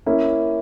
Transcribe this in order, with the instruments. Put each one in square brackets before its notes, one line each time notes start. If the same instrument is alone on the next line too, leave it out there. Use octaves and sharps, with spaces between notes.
[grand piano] A#3 C#4 E4